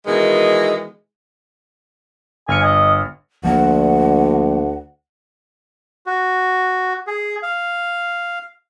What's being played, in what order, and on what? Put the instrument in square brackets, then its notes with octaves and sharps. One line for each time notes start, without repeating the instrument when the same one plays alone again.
[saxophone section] B2 D#3 E3 G#3
[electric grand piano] G1 F6 C#7 [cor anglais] G#5
[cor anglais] D#5
[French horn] D2 [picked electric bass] F3 A#3 [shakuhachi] F#5
[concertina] F#4
G#4
F5